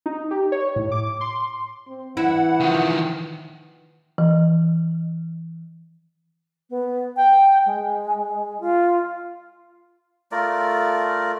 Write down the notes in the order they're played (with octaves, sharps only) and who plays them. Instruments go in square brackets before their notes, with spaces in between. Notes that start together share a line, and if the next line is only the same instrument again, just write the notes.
[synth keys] D#4
G4
C#5
A2
D6
C6
[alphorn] C4
[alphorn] E3 [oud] E4 [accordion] F#5
[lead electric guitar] D#3 F3
[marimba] E3
[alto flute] B3
G5
G#3
F4
[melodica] A3 F4 A#4 D5